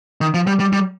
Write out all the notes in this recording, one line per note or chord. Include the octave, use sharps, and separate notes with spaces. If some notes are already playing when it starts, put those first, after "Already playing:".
D#3
F3
G3
G3
G3